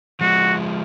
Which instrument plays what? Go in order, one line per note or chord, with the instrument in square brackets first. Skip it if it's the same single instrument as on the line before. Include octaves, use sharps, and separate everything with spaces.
[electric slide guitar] F3 G#3 [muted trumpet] F#4